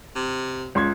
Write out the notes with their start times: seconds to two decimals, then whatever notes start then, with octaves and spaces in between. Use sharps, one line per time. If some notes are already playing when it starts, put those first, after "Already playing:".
0.15 C3
0.75 C#2 C6 G#6